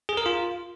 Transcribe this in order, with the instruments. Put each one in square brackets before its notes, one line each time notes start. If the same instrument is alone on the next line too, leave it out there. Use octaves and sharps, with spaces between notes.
[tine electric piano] G#4
A#4
F4